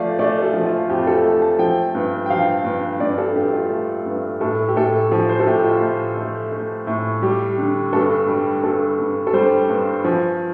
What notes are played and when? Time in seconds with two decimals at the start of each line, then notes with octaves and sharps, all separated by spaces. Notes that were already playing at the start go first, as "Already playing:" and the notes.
Already playing: F3 A3 D5 F5
0.19 A3 D5
0.42 A4
0.53 F3
0.65 F4
0.89 F2 G4
1.07 A4
1.24 A3 A5
1.42 A5
1.59 F3 G5
1.95 G2
2.26 G5
2.30 F3 F5
2.64 G2
3.00 G2 D5
3.18 A4
3.35 G2 G4
3.53 F4
3.70 A3
4.06 G2
4.40 A2 A4
4.68 G4
4.76 A2 A4
5.11 F3
5.29 C5
5.40 A4
5.47 A2 G4
5.64 F4
5.82 A2
6.17 A3
6.52 A3
6.87 A2
7.22 G3 G4
7.58 D3
7.93 G2 A4
8.28 G3
8.63 G2 A4
8.99 G2
9.27 A4
9.33 G3 C5
9.69 G2
10.05 F3